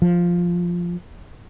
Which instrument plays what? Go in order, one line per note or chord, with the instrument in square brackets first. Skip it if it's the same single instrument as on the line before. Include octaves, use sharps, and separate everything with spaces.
[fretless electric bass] F3